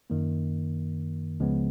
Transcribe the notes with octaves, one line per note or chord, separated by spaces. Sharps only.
F#2 D#3 A#3
C#2 C#3 F3 G#3 B3